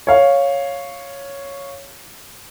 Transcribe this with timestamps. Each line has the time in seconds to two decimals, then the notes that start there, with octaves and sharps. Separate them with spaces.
0.07 C#5 F5